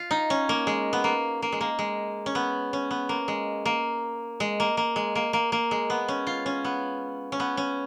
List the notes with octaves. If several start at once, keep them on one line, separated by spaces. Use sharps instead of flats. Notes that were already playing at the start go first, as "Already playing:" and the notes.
Already playing: F4
D#4
C#4
A#3
G#3
B3
A#3
A#3
G#3
A#3
G#3
C#4
B3
C#4
B3
A#3
G#3
A#3
G#3
A#3
A#3
G#3
A#3
A#3
A#3
G#3
B3
C#4
F4
C#4
B3
C#4
B3
C#4